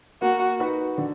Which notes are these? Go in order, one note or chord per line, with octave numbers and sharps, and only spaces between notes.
A#3 F#4
D#4 F#4 B4
D3